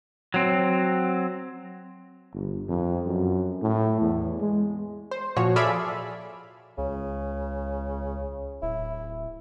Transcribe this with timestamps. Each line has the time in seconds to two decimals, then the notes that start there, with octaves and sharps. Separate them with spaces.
0.34 F#3 C4
2.33 G1
2.69 F2
3.06 F#2
3.62 A2
4.01 E2
4.40 G#3
5.11 C5
5.36 A#2 F3 F#4 C#5
5.56 G#4 A4 D5 E5 F5 B5
6.78 C#2 C#3
8.62 D1 E4